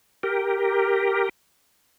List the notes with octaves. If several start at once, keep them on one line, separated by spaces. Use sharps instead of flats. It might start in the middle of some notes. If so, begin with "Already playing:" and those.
G4 A#4